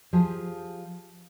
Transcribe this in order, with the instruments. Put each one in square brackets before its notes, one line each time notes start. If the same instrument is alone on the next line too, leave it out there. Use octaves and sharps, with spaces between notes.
[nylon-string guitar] F3 G4 G#4